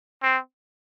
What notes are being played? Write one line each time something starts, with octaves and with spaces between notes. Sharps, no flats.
C4